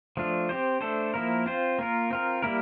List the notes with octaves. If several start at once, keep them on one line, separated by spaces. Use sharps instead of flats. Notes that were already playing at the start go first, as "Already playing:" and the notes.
F3 A3 D4 F4
C4 G4 C5
A3 D4 A4 C5
F3 A#3 E4 A#4
C4 F4 C5
A#3 F4 A#4
C4 F4 A#4
G3 A#3 E4 A#4